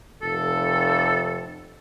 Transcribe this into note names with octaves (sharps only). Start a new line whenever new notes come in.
F1 A4